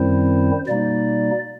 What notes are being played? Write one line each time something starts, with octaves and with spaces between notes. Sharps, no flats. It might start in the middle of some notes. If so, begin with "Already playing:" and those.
Already playing: F#2 D#3 G3 C4 E4 C5
B2 G3 A#3 D#4 D5